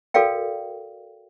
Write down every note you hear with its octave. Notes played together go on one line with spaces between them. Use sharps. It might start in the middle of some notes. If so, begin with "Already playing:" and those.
F#4 A4 A#4 D5 F5 G5